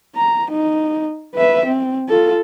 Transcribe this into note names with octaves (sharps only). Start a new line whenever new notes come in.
A#5
D#4
B4 E5
C4
F4 A4